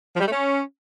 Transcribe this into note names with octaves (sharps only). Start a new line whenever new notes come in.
F3
G3
A3
C#4